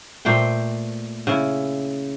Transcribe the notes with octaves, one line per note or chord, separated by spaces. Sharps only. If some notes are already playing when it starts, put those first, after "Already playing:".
A#2 A3 C5 G5
C#3 E4